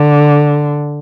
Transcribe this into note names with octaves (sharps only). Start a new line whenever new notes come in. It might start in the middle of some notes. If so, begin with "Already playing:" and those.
Already playing: D3